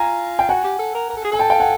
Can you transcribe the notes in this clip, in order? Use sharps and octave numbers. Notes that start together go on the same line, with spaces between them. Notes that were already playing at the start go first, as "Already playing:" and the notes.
Already playing: F4 G#5 A#5
G5
F#4 F#5 G#5
G4
A4
A#4
A#4
A4
G#4
A4 G#5
G5 A5
F5 G5
F#5 G#5